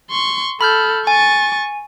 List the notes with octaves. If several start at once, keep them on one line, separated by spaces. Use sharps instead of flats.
C6 C#6
A4 B5 F6 G6
G#5 C#6 A6